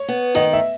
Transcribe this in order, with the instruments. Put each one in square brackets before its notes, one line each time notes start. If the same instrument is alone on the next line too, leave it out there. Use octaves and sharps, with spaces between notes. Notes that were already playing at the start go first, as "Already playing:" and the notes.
Already playing: [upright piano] C#5
[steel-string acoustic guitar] B3
[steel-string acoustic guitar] D#3 [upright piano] D#5
[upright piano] E5